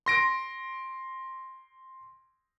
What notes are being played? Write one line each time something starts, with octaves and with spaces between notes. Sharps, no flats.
C6 A#6 D7